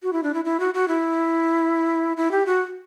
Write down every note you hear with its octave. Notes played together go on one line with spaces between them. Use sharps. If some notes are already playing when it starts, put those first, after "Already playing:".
F#4
E4
D4
E4
E4
F#4
F#4
E4
E4
G4
F#4